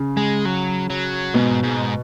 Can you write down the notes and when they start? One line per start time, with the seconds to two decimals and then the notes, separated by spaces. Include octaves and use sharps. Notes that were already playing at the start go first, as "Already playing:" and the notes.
Already playing: C#3
0.17 G#3
0.46 F#3
0.90 F#3
1.34 G#2 B2
1.63 G#2